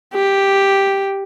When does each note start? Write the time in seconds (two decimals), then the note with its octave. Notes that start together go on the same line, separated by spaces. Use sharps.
0.14 G4